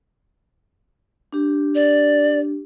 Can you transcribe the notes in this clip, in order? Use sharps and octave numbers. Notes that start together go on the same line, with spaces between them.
D4 G4
D5